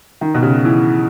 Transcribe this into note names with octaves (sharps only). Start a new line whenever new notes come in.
D#3
B2
C#3
E3